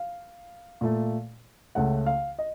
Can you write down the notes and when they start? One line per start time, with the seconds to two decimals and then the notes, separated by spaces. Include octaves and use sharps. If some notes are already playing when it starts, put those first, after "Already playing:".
Already playing: F5
0.81 A#2 A3
1.75 C#2 C#3 A3 F#5
2.06 F5
2.39 D#5